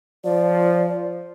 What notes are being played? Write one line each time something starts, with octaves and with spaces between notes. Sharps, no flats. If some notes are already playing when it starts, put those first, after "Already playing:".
F3 D5